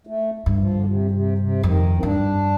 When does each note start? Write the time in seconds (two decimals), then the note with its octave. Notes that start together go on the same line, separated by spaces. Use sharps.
0.07 A3
0.46 G2
0.59 F3
0.74 D3
0.85 C3
1.11 C3
1.38 C3
1.63 F2 D#3
1.97 C4
2.03 G2 D4